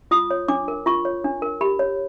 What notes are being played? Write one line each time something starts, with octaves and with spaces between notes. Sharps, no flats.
F4 D#6
C#5
D4 D6
A#4
F4 C#6
C#5
D4
A#4
G4 B5
C#5